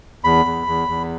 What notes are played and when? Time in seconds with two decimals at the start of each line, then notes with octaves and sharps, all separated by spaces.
0.24 E2 B5
0.46 E2
0.67 E2
0.88 E2